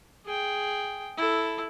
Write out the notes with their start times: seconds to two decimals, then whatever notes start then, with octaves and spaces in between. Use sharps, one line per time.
0.25 G#4 G5
1.17 E4 A4